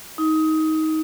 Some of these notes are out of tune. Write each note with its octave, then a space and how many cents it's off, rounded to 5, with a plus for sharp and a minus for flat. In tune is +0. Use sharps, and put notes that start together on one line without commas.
D#4 +20